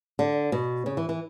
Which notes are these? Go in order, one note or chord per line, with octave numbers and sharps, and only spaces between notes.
D3
B2
C#3
E3
E3